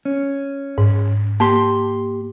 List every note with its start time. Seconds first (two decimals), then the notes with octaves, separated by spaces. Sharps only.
0.05 C#4
0.78 G#2
1.40 A#3 G4 A5 C6